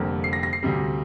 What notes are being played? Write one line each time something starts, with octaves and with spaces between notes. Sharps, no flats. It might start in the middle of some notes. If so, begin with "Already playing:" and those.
Already playing: F1 F2 D3 G3 A#3
C7
A#6
A#6
C7
D2 C3 G3